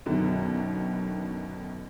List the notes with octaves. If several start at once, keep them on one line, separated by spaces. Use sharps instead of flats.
F#2 B2 D3 D#3